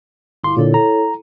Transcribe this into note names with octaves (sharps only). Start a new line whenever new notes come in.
G1 E4 F5 C6 D6
A#2 D3 E4 A4 C#5
A#5